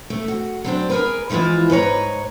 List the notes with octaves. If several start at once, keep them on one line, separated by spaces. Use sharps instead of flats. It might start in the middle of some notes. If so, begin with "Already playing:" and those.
A3
F#4
F#3 C4 D4
G#4 A#4 B4
E3 F3 G#3 E4 F4
G#2 B4 C#5 A#5